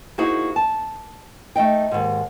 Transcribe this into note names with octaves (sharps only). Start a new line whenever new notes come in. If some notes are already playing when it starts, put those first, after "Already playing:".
A#3 D#4 E4 F#4 G#4 C5
A5
A3 D#4 D#5 G5
D#2 G#2